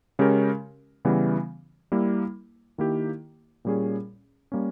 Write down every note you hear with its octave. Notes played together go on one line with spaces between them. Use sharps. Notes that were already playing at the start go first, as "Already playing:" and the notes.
C#3 G#3 C#4 G4 A#4
C#3 E3 G3 B3
G3 A#3 E4
D#3 A#3 E4 G4
A#2 G3 C#4 G#4
G3 A#3 C#4